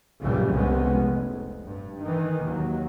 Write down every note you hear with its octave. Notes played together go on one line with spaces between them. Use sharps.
A#1 F#2 C#3 E3 G3
C2 C3 G#3 B3 C#4
F1
G2
D#3 E3
D#2 F#3